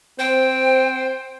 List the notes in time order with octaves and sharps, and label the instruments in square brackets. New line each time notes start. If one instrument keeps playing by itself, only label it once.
[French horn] C4 [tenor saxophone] C5 [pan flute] G5